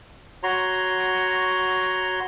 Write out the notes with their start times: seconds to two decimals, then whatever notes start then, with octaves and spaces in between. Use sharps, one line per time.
0.43 F#4 C#5 A#5 C6